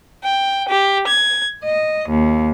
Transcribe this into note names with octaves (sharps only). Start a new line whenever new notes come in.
G5
G4
G#6
D#5
D#2